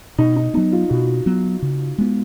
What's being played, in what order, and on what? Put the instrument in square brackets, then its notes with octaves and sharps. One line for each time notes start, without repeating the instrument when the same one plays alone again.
[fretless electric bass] B2 [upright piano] D#4
[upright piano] D#4
[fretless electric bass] F#3 B3 [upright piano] D#4
[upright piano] F4
[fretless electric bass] B2 [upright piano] F#4
[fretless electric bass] F#3 B3
C#3
G#3 B3